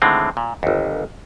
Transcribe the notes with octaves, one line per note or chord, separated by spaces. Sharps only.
A2 D3 D#3 G#3 C4
A#2
G1 D#2